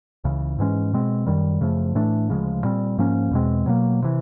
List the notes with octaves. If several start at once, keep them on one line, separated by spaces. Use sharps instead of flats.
C#2 C#3 E3
G#2 E3 G#3 C#4
B2 G#3 C4
F#2 D#3 G3
F#2 C#3 F3 A3
A2 E3 A3 D4
D2 C#3 F3 G#3
A#2 G3 C4
G#2 F3 A#3 C#4
E2 B2 G#3 C4
B2 F#3 A#3
C3 E3